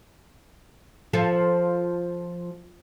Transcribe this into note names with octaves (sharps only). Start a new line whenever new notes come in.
F3 F4 A4